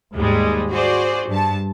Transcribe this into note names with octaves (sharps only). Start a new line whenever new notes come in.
D#2 G#2 G3 G#3
F#4 G#4 C5 D5
G2 A5